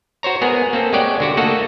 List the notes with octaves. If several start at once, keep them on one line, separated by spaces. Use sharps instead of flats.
F#4 C5 C#5 A#5
G#3 B3 G#4 A#4
A#3 C4 A4
G#3 G4 C#5 D5 F#5 G5
D3 F#4 G4
A3 A#3 F#4 A4 D#5 F#5